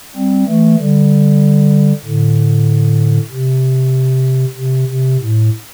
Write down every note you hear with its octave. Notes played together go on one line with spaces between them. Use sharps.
G3 C4
E3 A3
D3 G3
A2 D3
C3
C3
C3
A2